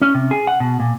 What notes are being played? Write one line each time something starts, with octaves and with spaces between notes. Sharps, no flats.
C#4
C3
G#4
F#5
B2
A#2